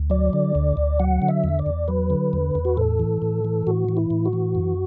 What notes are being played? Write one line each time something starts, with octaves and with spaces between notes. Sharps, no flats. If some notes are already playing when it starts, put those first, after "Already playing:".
Already playing: D2
F#3 D5
D3
D2
D2
F#3 F#5
D3
E5
E2
D5
E2
F#3 B4
D3
E2
E2
F#4
A2 A4
E3
A2
E3
A2 F#4
E3
E4
A2
F#4
E3
F#2